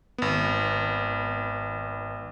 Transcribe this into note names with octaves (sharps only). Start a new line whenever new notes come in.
G#1 B3